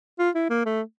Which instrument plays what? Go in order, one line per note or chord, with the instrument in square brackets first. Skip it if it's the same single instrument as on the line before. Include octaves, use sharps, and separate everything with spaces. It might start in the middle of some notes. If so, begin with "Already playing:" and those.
[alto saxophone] F4
E4
A#3
A3